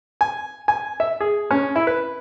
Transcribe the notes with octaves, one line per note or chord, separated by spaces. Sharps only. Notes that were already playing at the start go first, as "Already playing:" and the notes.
G#5
G#5
E5
G#4
C#4
E4
B4